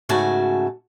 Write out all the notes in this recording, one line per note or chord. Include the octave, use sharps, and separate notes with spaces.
G#2 C#3 A3 F#4 G#5 A5